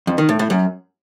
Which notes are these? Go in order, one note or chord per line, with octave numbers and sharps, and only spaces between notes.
F2
D#3
A2
A2
F#2